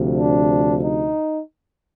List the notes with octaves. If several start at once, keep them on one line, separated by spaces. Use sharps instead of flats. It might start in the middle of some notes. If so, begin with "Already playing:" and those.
Already playing: D2 C3 F3
D4
D#4